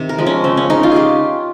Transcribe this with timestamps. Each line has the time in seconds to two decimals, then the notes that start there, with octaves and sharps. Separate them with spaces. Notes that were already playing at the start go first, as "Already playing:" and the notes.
Already playing: C3 D#3
0.09 A#4
0.18 F3 G#3
0.27 C#4
0.44 C#3 C4
0.57 C#4
0.70 G#3 D#4
0.83 F4
0.92 C#3 G4 G#4